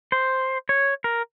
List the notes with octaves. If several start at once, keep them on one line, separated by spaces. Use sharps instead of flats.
C5
C#5
A#4